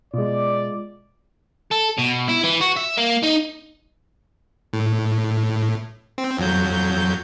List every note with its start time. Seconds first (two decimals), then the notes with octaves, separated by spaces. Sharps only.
0.14 B2 G#3 F4 D5
1.71 A4
1.98 B2
2.28 E4
2.44 E3
2.61 F#4
2.77 E5
2.98 A#3
3.23 D#4
4.73 A2
6.18 C4
6.39 F2 F#3 G6